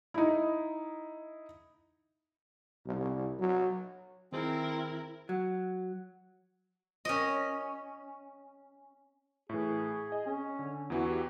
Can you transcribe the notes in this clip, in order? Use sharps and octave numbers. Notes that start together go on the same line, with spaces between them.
D#4 E4
C2
F#3
D#3 C4 E4 G#4 A#4
F#3
C#4 D#5
A2 E3 G#4
D#5
C#4
D3
E2 E3 E4 F#4
G4